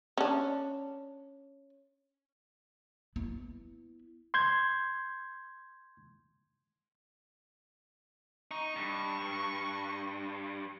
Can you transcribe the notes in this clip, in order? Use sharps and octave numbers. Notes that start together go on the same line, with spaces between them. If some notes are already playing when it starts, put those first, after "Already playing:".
C#4 D4
B3 E4
C6 G6 G#6
D#4 C#6
G2